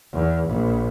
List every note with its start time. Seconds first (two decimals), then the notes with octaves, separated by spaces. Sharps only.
0.13 E2
0.48 A#1